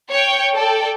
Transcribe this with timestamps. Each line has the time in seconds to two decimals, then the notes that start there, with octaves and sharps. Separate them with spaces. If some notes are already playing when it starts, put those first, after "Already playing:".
0.10 C#5 G5
0.54 A4 D5 G5